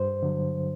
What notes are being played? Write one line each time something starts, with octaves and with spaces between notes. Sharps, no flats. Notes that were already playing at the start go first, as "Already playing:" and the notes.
Already playing: G2 C5
D3 F#3